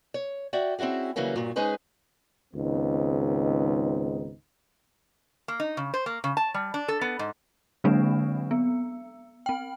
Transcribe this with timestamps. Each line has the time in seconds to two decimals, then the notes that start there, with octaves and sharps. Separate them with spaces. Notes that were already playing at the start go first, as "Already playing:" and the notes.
0.14 C#5
0.53 F#4 D5 E5 G5
0.79 C4 C#4 E4 F#4 G#4
1.16 C#3 E3 F#3 G3 A#3 C#4
1.36 G2 A#2 F#3
1.56 G#3 C#4 D#4 G#4 B4 C5
2.54 C#2 G#2 D#3 B3 C4 D#4
5.48 A#3
5.60 D#4
5.77 C#3
5.94 C5
6.06 A#3
6.24 C#3
6.37 A5
6.54 G3
6.74 D4
6.88 A4
7.01 B3
7.19 G#2
7.84 D3 F#3 G#3 A#3 C4 D4
8.51 B3
9.46 C4 G5